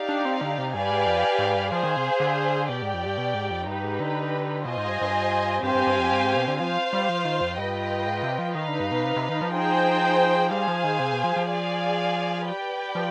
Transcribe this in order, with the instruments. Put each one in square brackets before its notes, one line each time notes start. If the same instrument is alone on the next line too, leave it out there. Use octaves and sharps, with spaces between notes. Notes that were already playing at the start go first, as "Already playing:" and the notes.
Already playing: [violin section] D#4 G4 D5 F5
[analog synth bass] D4
C4
D3
C3
[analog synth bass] G2 [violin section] G4 B4 D5 F5 G#5
[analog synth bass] G#2
F2
G#2
G2
[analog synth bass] F3 [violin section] G#4 C5 F5
[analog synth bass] D#3
C3
D3
[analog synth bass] B2 [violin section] G4 D5 G5
[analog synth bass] G#2
F2
G2
B2
G#2
F2
[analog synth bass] G2 [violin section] D#4 G4 B4
[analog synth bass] G#2
D3
[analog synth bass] B2 [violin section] F4 C5 D#5 G#5
[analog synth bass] G#2
G2
G2
[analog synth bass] G2 [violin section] C4 G4 C5 F5 G#5
[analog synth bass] G2
G2
F2
G2
G#2
B2
D3
[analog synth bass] F3 [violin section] F4 C5 F5
[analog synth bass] G3
F3
D#3
F2
[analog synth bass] G2 [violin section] F4 B4 D#5 G5
[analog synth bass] G#2
C3
F3
[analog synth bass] D#3 [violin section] D#4 B4 F5
[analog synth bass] D3
G2
B2
C3
C3
D#3
F3
[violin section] D#4 G#4 C5 G5
[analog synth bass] G3 [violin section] G#4 C5 F5 G#5
[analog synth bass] F3
D#3
C3
B2
F3
F3
[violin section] G#4 D5 F5 G#5
G4 B4 D5 G5
[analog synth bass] F3